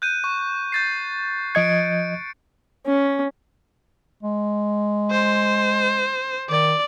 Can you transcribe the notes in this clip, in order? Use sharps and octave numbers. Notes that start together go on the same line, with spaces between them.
F#6 G6 D#7
C#6
G6 A6 C7
F3 D#5 G#6 C#7 D7
C#4
G#3
C5
D#3 D5